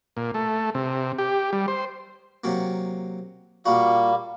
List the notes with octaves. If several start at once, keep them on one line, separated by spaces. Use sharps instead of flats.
A#2
A3
C3
G4
G3
C5
C3 F#3 A#3
A#2 G3 A#3 F#4